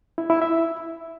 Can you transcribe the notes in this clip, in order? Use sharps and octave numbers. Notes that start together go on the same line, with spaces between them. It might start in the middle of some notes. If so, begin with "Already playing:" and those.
E4
E4
E5